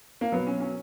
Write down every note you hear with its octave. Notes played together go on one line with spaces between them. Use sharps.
A#3
B2 F#3 B3
C#4
C#4